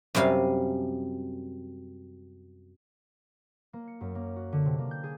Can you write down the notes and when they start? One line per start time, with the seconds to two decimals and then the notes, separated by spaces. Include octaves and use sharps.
0.15 F#2 C3 G3 F5 G#5
3.73 A#3
3.88 C#7
4.01 F#2
4.15 A#3
4.36 F#4
4.53 D3
4.65 C3
4.79 A#3
4.91 G6
5.03 G#4